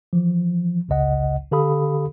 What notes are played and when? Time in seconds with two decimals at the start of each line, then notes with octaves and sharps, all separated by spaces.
0.13 E3 F3
0.89 G#1 C#2 C#3 D#5 F#5
1.51 D3 G4 A4 F5 B5 D#6